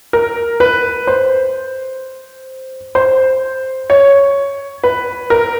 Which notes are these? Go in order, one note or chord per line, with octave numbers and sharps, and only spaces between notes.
A#4
B4
C5
C5
C#5
B4
A#4